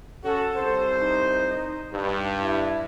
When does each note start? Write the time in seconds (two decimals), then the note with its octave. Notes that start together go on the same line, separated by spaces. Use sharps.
0.24 C#4 F#4 A4
0.56 C2 C5
0.99 D#4
1.92 G2
2.40 E4